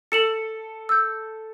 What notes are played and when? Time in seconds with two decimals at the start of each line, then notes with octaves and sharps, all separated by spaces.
0.12 A4 C#7 E7 F#7
0.89 E6 G6